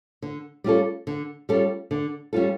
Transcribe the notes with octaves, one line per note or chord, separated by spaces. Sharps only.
D3
G3 C#4 F4 A4
D3
G3 C#4 F4 A4
D3
G3 C#4 F4 A4